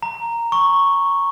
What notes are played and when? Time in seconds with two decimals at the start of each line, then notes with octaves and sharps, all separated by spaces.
0.03 A#5
0.52 C#6